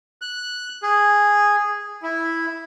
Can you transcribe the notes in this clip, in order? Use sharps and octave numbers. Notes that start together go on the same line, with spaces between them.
F#6
G#4
E4